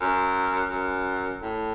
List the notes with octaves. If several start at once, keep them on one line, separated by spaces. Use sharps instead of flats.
F#2
F#2
A2